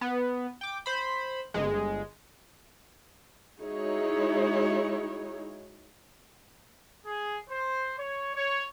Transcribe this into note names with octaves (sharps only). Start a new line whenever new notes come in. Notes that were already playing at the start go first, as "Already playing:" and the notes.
B3
G5 D6
C5 B5
G1 G#3
G#3 D#4 E4 F#4 G#4 C#5
G#4
C5
C#5
C#5